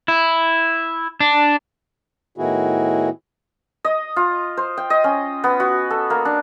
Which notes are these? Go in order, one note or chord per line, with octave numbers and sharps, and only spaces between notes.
E4
D4
A2 D#3 B3 E4 F#4 G#4
D#5
F4
C5
G5
D#5
C#4
B3
F#4
A4
A#3
D4